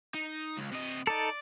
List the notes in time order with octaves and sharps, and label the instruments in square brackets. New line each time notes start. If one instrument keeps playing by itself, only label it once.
[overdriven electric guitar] D#4
C#2
C3 D#5
[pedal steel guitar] D#4 A4 [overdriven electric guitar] D5